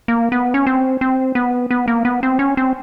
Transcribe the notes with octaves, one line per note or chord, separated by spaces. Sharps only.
A#3
B3
C#4
C4
C4
B3
B3
A#3
B3
C4
C#4
C4